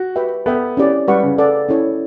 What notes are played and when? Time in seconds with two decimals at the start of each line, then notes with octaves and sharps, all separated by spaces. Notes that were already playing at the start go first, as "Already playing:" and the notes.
Already playing: F#4
0.16 G4 B4 E5 G5
0.46 B3 A4 E5 G5
0.77 C#4 E4 G4 D5
1.08 G3 B4 F#5 C#6
1.23 C#3
1.38 A4 D5 F#5
1.69 C#4 E4 A4 C#5